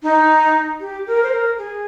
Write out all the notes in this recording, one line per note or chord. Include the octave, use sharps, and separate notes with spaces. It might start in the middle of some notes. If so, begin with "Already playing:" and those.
D#4
G4
A#4
C5
A#4
G#4